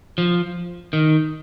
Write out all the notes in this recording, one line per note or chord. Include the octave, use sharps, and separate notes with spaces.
F3
D#3